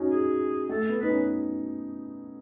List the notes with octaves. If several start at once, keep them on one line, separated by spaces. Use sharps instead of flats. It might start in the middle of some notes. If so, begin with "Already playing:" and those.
Already playing: C#4 D#4 F#4
G#4
A3 A4
B3
D#4 B4
C#4